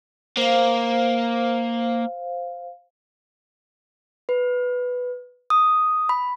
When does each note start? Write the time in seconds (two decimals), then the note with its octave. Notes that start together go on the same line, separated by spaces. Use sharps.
0.37 A#3 C5 F5
4.29 B4
5.50 D#6
6.09 B5